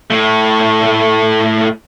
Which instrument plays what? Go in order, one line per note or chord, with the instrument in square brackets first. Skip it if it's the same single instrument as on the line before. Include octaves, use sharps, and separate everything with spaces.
[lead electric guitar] A2 A3